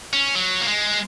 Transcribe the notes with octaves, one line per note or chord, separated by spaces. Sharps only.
C#4
F#3
A#3
G#3